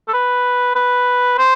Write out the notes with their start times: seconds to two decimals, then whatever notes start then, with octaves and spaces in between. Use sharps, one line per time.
0.08 A4
0.13 B4
0.76 B4
1.38 C5